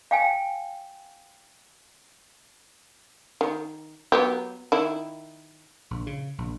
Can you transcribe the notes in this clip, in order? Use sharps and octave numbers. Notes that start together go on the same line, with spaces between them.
F5 G5 G#5
D#3
F#3 B3 G4
D#3 E4
A#1
C#3
A#1